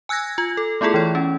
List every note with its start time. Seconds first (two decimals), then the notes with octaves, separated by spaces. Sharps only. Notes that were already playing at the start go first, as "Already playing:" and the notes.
0.09 G#5 E6 F#6 G#6 A#6
0.38 F4
0.57 A4
0.81 A3 B3 E4 F4 G#4 A4
0.94 E3 C#5
1.15 C#4